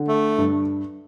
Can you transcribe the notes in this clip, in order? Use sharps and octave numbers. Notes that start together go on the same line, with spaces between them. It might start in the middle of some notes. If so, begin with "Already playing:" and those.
Already playing: D3
A3
G2